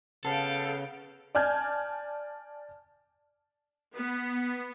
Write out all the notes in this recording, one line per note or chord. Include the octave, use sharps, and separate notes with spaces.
C#3 B3 A4 F5 G5
D5 G#5 A5 F6 G6 G#6
B3